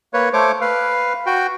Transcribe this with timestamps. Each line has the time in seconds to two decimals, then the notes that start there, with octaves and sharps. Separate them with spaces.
0.14 A#3 B4 C#5
0.33 A3 C5 C#5 D6
0.61 B4 F5
1.26 F#4 G5